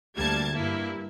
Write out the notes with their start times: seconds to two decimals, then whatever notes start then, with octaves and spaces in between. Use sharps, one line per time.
0.17 D2 G3 A#3 A5 G#6
0.56 G2 A#3 E4